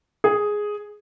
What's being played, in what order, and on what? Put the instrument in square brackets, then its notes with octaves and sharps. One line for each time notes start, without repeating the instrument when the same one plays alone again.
[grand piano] G#4